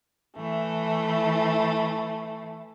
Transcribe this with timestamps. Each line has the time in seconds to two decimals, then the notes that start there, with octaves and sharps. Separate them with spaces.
0.37 E3 A3